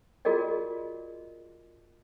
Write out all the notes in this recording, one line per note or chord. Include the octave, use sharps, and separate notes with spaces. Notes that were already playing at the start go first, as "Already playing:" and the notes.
F4 F#4 G#4 A#4 D5 D#5